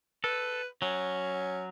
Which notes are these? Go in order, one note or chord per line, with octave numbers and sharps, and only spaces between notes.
A4 B4
F#3 C#4